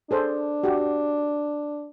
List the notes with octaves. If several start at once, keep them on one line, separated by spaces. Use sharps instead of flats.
D4 G#4 A4 C5
F#4 G4